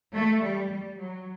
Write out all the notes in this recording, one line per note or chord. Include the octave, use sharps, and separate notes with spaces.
A3
G3
G3
F#3